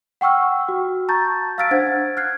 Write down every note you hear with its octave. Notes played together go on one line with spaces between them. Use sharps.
F#5 G5 C#6 E6 F6
F#4
A5 A#5 C#6 G6 A6
F5 E6 F6 A6 B6 D7
D4 C5 F#5 G#6 A6
F6 F#6 G#6 C7